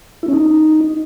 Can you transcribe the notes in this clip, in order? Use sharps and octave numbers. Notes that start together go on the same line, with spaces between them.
E4
C#4
D#4